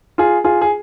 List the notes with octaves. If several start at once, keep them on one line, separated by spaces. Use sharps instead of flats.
F4 G#4
F4 G#4
G#4